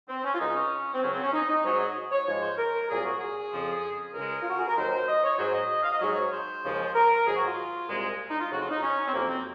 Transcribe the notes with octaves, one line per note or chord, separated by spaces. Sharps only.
C4
C#4
F4
C#2 C#3 G#3 D#4
C#4
C4
C#2 C#3 F#3 C#4
C4
C#4
D#4
D#4
G#2 F#3 C#5
D#5
C#5
G#2 F3 G#3 C#5
C5
A#4
C2 A#2 F#3 G#4
F#4
G#4
F2 C#3 F3
C#2 C#3 G#3 A#4
F4
F#4
G#4
A#4
D#2 D#3 F#3 C5
D#5
C#5
G#2 F#3 C5
D#5
F5
D#5
G#2 F#3 C#5
C5
D#2 C#3 F3 G#3
A#4
G#2 D#3 F#3 G#4
F#4
F4
C2 A#2 G#3
D#4
F4
F2 C#3 F#3 F#4
F4
D#4
C#4
C4
F2 C3 F#3 A#3
C4